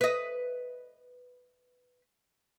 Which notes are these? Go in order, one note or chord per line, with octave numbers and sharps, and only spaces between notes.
B4 D#5